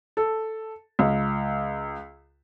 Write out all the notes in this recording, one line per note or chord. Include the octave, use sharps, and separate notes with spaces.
A4
C#2